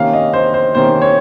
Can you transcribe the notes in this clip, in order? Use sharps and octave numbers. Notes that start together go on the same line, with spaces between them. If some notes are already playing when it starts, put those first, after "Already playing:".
Already playing: C3 D#3 A#3 C#4 F5
D#5
C5
C5
C3 D#3 A#3 C#4 C5
C#5